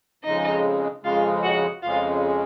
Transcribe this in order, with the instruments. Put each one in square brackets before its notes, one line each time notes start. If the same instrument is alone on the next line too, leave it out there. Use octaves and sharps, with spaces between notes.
[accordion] F2 C#3 G#3 [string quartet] D#4 D#5
[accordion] F2 C#3 G#3 [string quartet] F4 F5
[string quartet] F#4 F#5
[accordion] F2 C#3 G#3 [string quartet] F4 F5